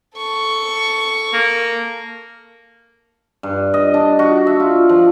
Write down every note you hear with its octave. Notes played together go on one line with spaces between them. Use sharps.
A4 C#6
A#3
G2
D#5
D4
F#4
E5
F4
F3